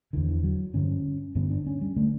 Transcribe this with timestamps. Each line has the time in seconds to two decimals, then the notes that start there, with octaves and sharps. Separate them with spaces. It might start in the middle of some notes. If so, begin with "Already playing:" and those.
0.13 E2 D3 E3
0.29 E3
0.44 F#3
0.74 G2 D3 C#4
1.35 G2 D3 B3
1.50 D4
1.67 C#4
1.81 G3
1.96 D3 A3